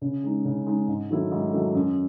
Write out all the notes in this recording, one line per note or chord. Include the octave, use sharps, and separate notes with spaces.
C#3
G#3 D#4
C#3
G#3 D#4
G#2
D#3 F#3 A3 E4
G#2
D#3 F#3 A3 E4
F#2